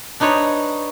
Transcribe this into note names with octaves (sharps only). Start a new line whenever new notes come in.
D4 D#4 B4 C#5